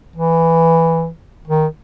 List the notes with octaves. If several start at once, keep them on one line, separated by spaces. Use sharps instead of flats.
E3
D#3